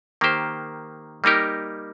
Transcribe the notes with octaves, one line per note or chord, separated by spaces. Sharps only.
D#3 A#3 G4 C5
G3 A#3 D#4 G4 A#4